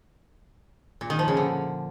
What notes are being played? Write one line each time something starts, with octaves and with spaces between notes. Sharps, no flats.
A#2
D#3
F3
C#3
D3